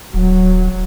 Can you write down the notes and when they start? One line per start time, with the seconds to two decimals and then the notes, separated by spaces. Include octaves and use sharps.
0.14 D1 F#3